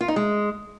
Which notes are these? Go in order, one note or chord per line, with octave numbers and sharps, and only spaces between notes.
F4
D#4
G#3